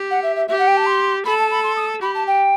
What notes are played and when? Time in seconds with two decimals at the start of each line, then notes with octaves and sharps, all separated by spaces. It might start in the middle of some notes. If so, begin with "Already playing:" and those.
Already playing: G4
0.11 F#5
0.23 E5
0.36 E5
0.48 G4 E5
0.59 F#5
0.67 G5
0.77 A5
0.86 C6
1.25 A4 B5
1.39 A5
1.51 B5
1.64 C6
1.77 D#6
2.02 G4 B5
2.15 A5
2.27 G5